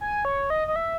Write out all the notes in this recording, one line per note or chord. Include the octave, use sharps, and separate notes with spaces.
G#5
C#5
D#5
D#5
E5